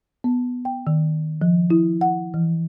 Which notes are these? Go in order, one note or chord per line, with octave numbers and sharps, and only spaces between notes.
B3
G5
D#3
F3
E4
F#5
E3